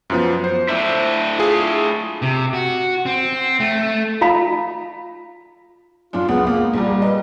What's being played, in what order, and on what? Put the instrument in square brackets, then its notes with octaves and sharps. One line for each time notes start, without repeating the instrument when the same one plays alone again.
[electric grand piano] F#2 F3 B3
C5
[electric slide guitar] A3 D4 E4
[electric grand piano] F4 G#4
[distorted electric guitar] C3
F#4
C4
A3
[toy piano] F4 F5 A#5 B5
[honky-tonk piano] F#2 D4 [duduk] F4
[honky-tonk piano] C#2 [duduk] B3
[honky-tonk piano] C#2 F5 [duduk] A#3
[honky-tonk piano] A#1 A#2 A#5 [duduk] G3
[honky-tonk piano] B4 D#5